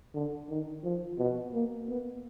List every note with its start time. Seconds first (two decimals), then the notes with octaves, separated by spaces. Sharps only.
0.14 D3
0.49 D#3
0.83 F3
1.18 B2
1.54 A#3
1.88 B3